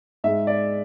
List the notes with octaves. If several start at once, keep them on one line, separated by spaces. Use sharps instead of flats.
G#2 G#3 E5
D5